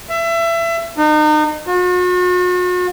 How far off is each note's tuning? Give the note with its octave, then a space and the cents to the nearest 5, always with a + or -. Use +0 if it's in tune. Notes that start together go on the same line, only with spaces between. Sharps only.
E5 +25
D#4 -35
F#4 -45